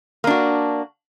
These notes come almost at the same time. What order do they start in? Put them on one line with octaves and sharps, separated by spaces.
A#3 D4 F#4